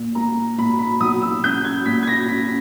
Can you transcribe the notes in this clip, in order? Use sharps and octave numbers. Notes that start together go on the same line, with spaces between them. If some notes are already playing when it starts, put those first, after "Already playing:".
Already playing: A#2
A#3 A#5
A#2 B5
B5
B1 D#6
E6
C#4 G6
G#6
A#2 B6
G#6
A#6
C#4 B6